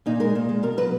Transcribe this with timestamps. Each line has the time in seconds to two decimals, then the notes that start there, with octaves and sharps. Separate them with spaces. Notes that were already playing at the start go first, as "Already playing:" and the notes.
0.06 A#2 D#4
0.20 G#3 A#4
0.35 A#2
0.49 G#3
0.63 B2 A#4
0.77 F#3 B4